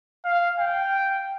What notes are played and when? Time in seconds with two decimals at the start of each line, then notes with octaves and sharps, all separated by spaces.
0.25 F5
0.60 G5